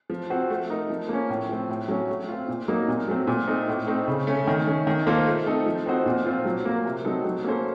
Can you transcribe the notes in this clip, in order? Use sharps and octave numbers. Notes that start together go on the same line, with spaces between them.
F3
C4 F#4
A3
D#4 A#4
F3
A#3 C#4
A2
F3 C4
A2
F#3 A3 C#4
A3
C4 F4
A#2
F#3 A#3 D#4 A#4
A#2
F#3 A3 C4
A#2
A3 C4 D#4
A2
A3 C4 D#4
C#3
A3 C#4
D#3
A3 C#4
D#3
A#3 F4 A4 C5
A3
C4 D#4 A4
F3
C4 D#4 F#4 C5
A#2
F3 C4 F4 C5
F#3
A#3 F4 A#4
C3
F#3 C4 D#4 A4
F#3
A#3 C#4 A4 C5